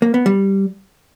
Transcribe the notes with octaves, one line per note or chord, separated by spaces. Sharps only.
A#3
B3
G3